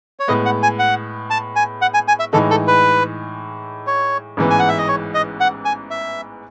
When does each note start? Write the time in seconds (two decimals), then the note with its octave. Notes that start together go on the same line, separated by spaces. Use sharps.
0.19 C#5
0.28 A2 G#3 B3 D#5
0.45 F#5
0.63 G#5
0.79 F#5
1.30 A5
1.56 G#5
1.82 F#5
1.94 G#5
2.08 G#5
2.20 E5
2.33 A2 E3 G#3 D#4 A4
2.51 A4
2.68 B4
3.87 C#5
4.37 A1 G#2 E3 B3
4.50 G#5
4.59 F#5
4.69 E5
4.78 D#5
4.88 C#5
5.14 D#5
5.40 F#5
5.65 G#5
5.91 E5